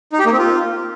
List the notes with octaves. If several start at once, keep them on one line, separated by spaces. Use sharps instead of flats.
D#4
G4
A#3
C4
F4